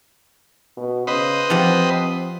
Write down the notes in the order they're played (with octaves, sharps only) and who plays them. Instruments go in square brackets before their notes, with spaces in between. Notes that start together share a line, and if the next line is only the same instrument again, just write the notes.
[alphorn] B2
[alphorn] C#3 [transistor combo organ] B4 C5 D#5
[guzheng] F3 G4 F#5 [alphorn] C4